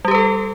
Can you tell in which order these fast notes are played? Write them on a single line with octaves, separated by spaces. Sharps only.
G3 G4 B4 A4